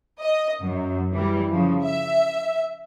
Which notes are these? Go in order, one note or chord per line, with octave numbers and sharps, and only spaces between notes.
D#5
F#2
E3 G3
C#3 F3
E5